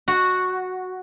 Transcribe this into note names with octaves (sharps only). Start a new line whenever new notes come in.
F#4